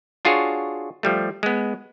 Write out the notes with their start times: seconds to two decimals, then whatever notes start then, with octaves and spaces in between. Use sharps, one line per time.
0.25 D4 F4 F#4 G#4 C#5
1.03 F3 G3 A3
1.43 G#3 B3